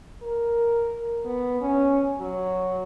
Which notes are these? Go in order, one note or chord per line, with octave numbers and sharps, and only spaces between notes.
A#4
B3
C#4
F#3